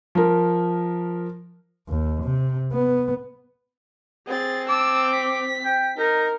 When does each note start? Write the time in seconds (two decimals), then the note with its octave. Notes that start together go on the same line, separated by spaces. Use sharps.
0.15 F3 A#4
1.88 D#2
2.23 C3
2.73 B3
4.27 C4 G#4 A6
4.70 A5 D6 E6
5.13 B6
5.65 G5
5.98 D#4 A#4